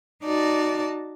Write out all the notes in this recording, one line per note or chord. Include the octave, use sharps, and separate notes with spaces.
D#4 F#4 D5 A5